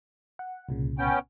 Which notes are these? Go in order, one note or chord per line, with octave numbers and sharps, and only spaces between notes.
F#5
C2 A#2 C#3
B3 C#4 G5